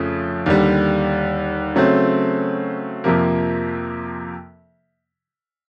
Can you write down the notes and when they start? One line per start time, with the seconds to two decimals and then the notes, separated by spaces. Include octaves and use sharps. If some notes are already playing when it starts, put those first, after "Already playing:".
Already playing: F2 C#3 F3 A3
0.46 D#2 D3 G3
1.76 C#3 F#3 A3 C4
3.04 F2 C3 F3 A#3